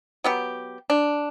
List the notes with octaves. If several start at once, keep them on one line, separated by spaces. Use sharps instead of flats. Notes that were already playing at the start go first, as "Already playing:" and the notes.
F#3 B3 G4
D4